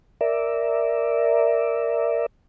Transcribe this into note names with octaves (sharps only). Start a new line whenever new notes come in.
A#4 D5 E5